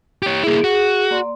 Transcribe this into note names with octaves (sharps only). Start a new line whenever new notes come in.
G4 C#5
A#3 E4 G#4
F#4
A#3 D5 C6